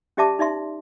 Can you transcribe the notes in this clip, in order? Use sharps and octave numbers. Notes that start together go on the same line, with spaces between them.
C#4 G4 D5 E5 A5 D6
D#4 D5 E5 C6